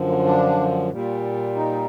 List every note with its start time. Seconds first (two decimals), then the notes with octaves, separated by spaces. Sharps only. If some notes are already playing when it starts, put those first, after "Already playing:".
Already playing: F#2 D3 F3
0.08 A#3
0.25 D4
0.90 A#2 G3
1.55 D#4